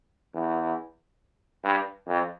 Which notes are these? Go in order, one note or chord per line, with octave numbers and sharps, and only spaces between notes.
E2
G2
F2